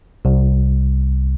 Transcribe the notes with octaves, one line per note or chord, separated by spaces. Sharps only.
C2